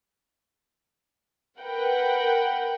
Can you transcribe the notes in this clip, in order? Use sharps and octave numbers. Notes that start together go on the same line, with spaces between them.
A#4 B4 F#5 G5